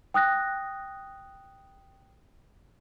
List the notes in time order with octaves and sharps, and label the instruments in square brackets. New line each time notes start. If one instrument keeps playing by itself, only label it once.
[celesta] G5 D#6 F#6 A#6